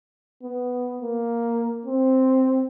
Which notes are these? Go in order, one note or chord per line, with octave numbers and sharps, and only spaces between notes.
B3
A#3
C4